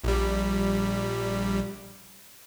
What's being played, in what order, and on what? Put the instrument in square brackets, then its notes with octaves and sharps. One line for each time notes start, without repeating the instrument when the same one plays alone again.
[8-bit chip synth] A#1 G3